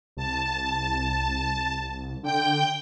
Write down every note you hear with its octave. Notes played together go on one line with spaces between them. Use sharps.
C2 A5
D3 G5 G6